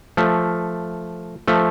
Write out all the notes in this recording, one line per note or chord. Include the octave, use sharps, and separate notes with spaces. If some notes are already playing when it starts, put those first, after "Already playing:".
F3 A3
F3 A3